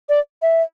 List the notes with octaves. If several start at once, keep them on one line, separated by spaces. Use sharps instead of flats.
D5
E5